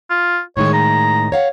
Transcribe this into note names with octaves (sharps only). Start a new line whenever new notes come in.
F4
A2 D#3 G#3 C#5
A#5
C#5 F5 F#5